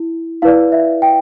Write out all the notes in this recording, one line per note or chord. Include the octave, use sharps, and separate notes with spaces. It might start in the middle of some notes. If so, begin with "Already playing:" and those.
Already playing: E4
E4 B4 D5 F5
E5
G5